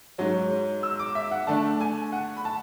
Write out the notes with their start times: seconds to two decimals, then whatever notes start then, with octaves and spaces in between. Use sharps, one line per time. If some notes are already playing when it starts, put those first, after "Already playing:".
0.18 G#2 F#3 C#4
0.83 E6
0.99 D6
1.15 E5
1.32 F#5
1.47 D3 A3 D4 A5
1.81 G#5
2.12 F#5
2.37 B5
2.45 A5